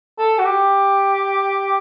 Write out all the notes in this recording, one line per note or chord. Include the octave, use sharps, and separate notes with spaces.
A4
F#4
G4